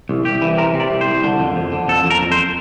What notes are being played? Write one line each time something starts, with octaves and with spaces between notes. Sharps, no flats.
C2
C2 G4
E3
C3 A#4
C3
D5
C2
C5
C2
D3
F2
F2
D3
F2 A4
F2
A#4
F2
C5